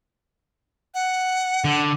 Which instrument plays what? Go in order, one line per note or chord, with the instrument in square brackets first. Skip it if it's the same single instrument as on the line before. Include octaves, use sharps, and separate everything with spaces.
[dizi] F#5
[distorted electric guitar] D3